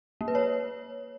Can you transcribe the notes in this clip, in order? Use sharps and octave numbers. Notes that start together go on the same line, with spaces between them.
A#3
B4
C#5